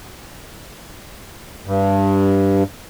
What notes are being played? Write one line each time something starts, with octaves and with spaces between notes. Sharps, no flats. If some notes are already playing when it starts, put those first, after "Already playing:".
G2